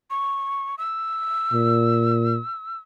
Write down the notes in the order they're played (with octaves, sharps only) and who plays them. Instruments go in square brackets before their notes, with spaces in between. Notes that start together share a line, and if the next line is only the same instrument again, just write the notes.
[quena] C#6
E6
[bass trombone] A#2